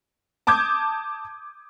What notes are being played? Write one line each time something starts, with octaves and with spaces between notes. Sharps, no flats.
A5 D6 D#6 G6 G#6